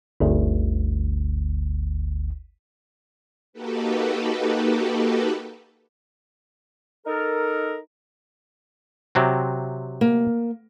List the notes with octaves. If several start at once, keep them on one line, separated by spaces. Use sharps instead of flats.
G1 D2
A#3 D#4 F#4 G4 A4 B4
D#4 A4 A#4
C3 F#3 C4
A#3